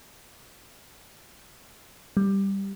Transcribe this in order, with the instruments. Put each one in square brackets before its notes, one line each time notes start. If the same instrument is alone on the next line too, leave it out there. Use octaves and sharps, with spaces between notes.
[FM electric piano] G3